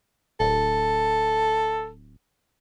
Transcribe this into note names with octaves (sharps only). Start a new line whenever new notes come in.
D1 A4